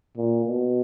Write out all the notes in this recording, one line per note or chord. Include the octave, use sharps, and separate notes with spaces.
A#2
B2